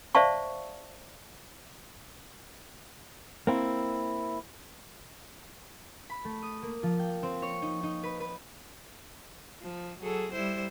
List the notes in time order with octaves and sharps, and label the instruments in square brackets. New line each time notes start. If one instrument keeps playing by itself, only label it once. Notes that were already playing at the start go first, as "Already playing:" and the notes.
[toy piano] C5 D5 E5 F5 A5 C#6
[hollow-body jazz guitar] A#3 C4 E4
[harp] B5
A3
D#6
A#3
F3
G5
C4
C#5
D#4
D#4
B4
B4
[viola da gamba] F3
F#3 G#4 A4
G3 E4 C5